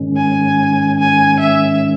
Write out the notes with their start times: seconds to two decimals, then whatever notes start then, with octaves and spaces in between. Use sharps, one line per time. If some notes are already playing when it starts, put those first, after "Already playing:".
Already playing: G#2 D#3 G#3 C#4
0.17 G#5
1.00 G#5
1.40 E5